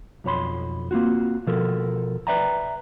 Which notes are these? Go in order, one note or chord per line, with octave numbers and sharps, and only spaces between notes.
B1 F2 C#5 B5 C6
A#3 C4 F4 F#4
B2 F3 A4 A#4
B4 D5 E5 G5 A#5